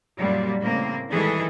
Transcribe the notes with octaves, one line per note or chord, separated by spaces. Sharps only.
F#2 A#2 F#3 G3
A2 C#3 A#3 C4
D#3 E3 G3 G#3 G#4 A4